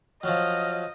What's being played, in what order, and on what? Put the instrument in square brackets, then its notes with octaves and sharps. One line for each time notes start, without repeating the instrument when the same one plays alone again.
[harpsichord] F3 F#3 [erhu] D#5 [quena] F6